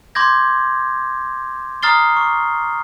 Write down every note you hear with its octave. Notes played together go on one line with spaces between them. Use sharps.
C6 D6 G6 G#6 A#6
A#5 D#6 F6 A6 C7 G7
C#6